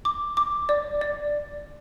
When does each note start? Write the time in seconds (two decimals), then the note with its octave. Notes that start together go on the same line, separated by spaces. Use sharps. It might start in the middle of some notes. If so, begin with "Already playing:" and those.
0.05 D6
0.37 D6
0.69 D5
1.01 D5